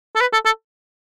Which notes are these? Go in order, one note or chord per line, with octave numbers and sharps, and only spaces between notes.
A4
B4
A4
A4